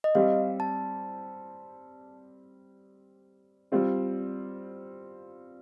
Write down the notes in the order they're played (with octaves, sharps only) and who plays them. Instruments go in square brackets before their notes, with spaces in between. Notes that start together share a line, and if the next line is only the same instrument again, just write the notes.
[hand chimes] D#5
[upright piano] G3 C4 G4 [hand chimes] F5
[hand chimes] A5
[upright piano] G3 C4 F4